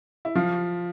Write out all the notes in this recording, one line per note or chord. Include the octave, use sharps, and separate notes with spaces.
E4
F3 F4